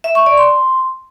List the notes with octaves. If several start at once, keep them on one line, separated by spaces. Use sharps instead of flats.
E5
C#6
D5
C6